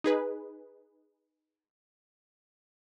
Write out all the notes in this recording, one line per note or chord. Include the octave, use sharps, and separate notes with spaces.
D#4 G#4 B4